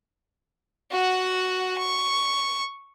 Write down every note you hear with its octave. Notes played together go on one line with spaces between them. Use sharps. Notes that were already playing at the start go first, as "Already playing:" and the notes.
F#4 F#5
C#6